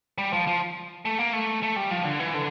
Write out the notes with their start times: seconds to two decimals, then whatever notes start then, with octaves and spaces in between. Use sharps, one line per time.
0.18 G3
0.33 F3
0.47 F3
1.05 A3
1.19 A#3
1.33 A3
1.63 A3
1.76 G3
1.90 F3
2.05 D3
2.20 E3
2.34 D3